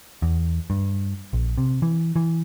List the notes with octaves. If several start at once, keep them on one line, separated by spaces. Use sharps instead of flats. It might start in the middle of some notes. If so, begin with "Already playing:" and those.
E2
G2
A#1
C3
E3
E3